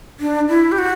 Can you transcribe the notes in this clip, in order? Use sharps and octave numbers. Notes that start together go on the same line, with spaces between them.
D4
E4
G4
F#4